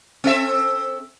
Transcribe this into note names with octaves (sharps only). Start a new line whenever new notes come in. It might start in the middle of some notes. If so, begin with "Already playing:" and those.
C4 A4 E5